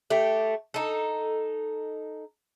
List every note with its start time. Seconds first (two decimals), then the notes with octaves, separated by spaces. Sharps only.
0.10 A3 G4
0.74 D#4 A4